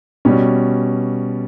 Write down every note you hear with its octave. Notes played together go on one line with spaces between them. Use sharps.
B2 G3 C#4